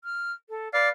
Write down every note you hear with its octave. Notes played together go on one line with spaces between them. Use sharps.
F6
A4
B4 D5 F5